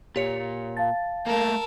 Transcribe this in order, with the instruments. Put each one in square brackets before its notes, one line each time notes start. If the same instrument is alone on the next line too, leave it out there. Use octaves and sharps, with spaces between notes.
[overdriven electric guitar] A#2 [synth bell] G4 C#5 C#7
[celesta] F5 A5 [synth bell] A6
[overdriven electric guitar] A3 A#3 [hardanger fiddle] A4 A#4